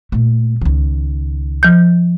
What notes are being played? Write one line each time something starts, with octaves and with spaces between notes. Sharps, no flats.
A#2 A3
C#2 D#3
F3 G6